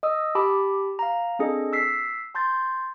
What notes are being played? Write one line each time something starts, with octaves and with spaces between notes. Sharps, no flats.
D#5 D#6 E6
G4 A5 B5 D6
F5 A#5
C4 D4 G#4 A4 D#5
E6 B6 C7
A5 C6 G6 A6